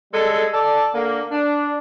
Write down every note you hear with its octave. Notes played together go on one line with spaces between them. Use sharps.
G3 G#3 A4
A4 D5
D3 A#3
D4